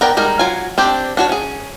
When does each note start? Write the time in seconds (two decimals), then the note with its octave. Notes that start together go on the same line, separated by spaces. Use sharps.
0.01 B3 A#4 D5 G5
0.17 G3 G#3 D#4 A#4
0.39 F#3 F4 G#5
0.78 C4 D4 G4
1.17 D4 F#4 C#5
1.29 C#4 G#4